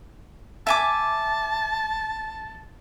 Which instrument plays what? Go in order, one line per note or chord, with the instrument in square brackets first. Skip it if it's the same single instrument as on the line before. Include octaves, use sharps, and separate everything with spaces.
[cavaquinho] E5 G#5 D6 [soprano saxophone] A5